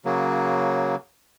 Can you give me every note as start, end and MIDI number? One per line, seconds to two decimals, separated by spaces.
0.05 0.96 49
0.05 0.96 54
0.05 0.96 58